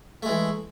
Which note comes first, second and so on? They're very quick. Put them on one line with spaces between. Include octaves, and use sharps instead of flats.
A3 G#3 E3